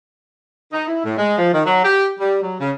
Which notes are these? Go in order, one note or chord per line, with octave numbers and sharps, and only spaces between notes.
D#4
E4
A2
G#3
F3
D#3
F#3
G4
G3
F#3
C#3